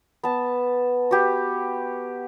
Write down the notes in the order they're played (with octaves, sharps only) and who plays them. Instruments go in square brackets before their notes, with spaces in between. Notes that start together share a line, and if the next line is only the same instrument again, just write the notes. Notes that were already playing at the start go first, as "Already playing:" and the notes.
[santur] B3 A5
F#4 G4 B4